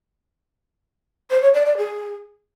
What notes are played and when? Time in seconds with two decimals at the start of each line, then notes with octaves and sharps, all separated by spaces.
1.30 C5
1.42 C#5
1.54 D5
1.66 D5
1.77 G#4